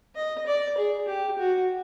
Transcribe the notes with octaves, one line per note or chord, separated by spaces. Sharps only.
D#5
D5
G#4
G4
F#4